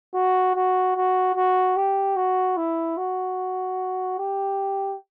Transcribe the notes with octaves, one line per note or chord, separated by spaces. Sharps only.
F#4
F#4
F#4
F#4
G4
F#4
E4
F#4
G4